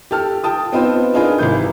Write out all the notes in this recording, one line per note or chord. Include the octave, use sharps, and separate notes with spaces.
G4 A4 A5 F6
G5 A5 D#6
B3 C4 D#4 F4 B4 C5
D4 D#4 F4 G#4 A#4 B4
G#1 C3 E3 B4 G6